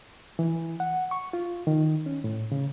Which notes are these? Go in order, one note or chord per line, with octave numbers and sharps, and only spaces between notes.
E3
F#5
C#6
F4
D#3
C#4
A2
C#3